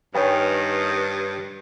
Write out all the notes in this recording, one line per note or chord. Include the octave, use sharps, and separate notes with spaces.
G2 D#3 B4 C#5 G5 G#5 A#5